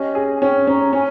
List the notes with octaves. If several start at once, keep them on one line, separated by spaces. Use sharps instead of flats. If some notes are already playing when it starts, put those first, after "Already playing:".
Already playing: C#4 G4 D#5
G#4
G#5
C#4 G5
C#4 A#5
C#4 G#5